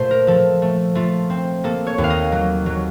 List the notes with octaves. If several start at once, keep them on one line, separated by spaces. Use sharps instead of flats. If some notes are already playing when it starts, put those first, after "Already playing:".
Already playing: A#2 A3 C5
A#4
F3 A4
A3
A3 F4
C4
A#3 A4
C#5
D#2
F5
D#5
F#3
F#3